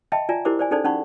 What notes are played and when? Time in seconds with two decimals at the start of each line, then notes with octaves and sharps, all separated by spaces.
0.12 D#5 E5 G5 A5 B5
0.29 F4 D5 G#5 A#5
0.45 E4 G4 A#4 C5 D6
0.59 C5 D5 G#5
0.71 C#4 D#4 G#4 A4 C5 D5
0.84 C#4 D#4 F#5 B5 C#6